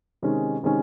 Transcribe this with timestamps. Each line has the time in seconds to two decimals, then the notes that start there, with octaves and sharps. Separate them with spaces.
0.22 C3 D#3 G#3 C#4
0.63 C3 D#3 G#3 C#4